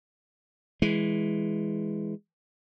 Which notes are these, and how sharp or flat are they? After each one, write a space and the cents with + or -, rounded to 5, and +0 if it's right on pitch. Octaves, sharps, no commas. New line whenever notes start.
E3 -5 G#3 +0